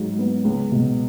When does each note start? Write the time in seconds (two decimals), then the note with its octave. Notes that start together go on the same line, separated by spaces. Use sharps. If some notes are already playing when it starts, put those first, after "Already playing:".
Already playing: G#2 F#3
0.19 B3
0.44 C#2
0.72 B2